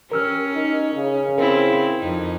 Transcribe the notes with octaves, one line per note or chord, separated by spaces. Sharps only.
C#4 G4 A#4 E6 F6
D#4
C#3
C4 E4 A#4
F2 D#4